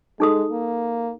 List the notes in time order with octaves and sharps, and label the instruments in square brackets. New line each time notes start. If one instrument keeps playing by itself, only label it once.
[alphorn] G#3 [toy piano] D#4 A4 D#6
[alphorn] A#3